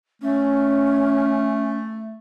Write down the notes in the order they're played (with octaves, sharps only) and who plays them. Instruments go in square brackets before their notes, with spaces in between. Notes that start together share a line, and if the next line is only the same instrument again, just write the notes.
[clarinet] A3 [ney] C#4